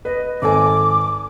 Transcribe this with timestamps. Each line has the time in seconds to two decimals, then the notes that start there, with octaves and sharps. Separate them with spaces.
0.05 B4 D#5
0.42 G#1 A4 G#5 D6